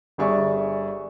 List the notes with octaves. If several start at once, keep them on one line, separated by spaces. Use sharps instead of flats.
G1 G3 G#4 D5 E5 C#6